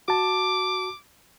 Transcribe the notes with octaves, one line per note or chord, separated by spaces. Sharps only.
F#4 A5 D6